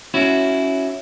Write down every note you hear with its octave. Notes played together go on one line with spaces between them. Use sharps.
C#4 E4 F#4